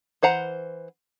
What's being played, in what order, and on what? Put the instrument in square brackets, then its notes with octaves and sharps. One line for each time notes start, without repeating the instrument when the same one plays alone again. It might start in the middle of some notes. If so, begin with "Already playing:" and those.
[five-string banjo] E3 C5 F#5 A#5